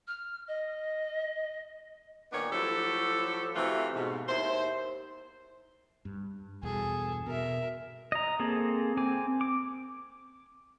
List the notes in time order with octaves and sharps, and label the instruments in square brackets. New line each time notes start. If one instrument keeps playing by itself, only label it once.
[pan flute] F6
D#5
[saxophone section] A#2 D#3 B3 D4 C#5
A2 F3 F#3 G4 A4
C3 E3 A3 F4 F#4
G#2 B2
D#2 E4 C5
[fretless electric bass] G2
[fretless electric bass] E2 G2 B2 [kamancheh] G#4 A4
[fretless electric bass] B2 [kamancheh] A#4 E5
[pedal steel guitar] D#5 A#5
A#3 C4 G#4 A4
C4 G#5 D6
D6